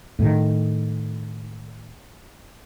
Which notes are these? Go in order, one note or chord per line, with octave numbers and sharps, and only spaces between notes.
A2 D#3